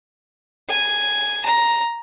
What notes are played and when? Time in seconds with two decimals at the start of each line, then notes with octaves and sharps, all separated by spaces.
0.69 G#5
1.45 A#5